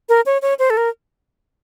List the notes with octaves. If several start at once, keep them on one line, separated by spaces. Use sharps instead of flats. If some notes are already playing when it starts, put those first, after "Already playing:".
A#4
C#5
C#5
C5
A4
A#4